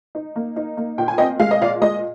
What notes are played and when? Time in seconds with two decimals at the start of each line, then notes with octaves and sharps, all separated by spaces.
0.15 D#4
0.36 A#3
0.56 D#4
0.77 A#3
0.98 A#2 G5
1.08 G#5
1.18 C4 D#5 G5
1.40 G#3 F5
1.51 D#5
1.61 A#2 D5 F5
1.81 G#3 D#5